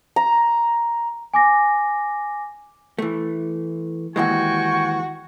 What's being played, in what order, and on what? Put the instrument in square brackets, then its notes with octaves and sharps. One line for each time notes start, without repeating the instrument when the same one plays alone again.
[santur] A#5
[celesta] G#5 D6 A#6
[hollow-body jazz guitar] E3 A3
[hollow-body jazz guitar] D#2 E3 G#3 [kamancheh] F#4 [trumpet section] G5 G#5 C#6